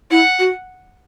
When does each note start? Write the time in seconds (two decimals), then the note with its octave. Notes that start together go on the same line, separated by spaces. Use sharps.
0.11 E4 F#5
0.39 F#4